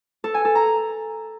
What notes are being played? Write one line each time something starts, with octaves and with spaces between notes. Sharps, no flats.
A4
G#5
A4
A#5